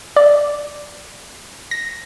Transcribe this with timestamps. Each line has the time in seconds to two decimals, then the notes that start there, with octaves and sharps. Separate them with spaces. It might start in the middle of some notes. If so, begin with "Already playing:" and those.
0.16 D5
1.71 A#6